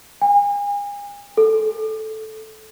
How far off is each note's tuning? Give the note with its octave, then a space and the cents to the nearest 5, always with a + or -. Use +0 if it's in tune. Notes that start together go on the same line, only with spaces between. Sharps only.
G#5 -40
A4 -10